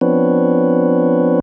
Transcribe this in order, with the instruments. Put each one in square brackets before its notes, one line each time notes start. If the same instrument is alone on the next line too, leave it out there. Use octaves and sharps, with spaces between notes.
[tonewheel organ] F3 B3 C4 D4 B4 C#5